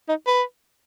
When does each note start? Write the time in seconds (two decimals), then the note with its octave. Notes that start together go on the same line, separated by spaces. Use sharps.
0.09 D#4
0.27 B4